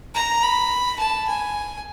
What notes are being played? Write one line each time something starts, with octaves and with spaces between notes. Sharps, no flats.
A#5
B5
A5
G#5